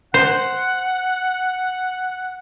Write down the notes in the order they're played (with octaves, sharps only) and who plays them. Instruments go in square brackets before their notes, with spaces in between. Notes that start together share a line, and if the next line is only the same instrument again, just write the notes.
[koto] C5 [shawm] F#5